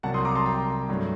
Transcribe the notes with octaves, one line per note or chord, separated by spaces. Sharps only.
C2 C3 F#3 F#5 A5
C6 D#6
A#5 D6
A5 C6
G5 A#5
G2 F#3 A3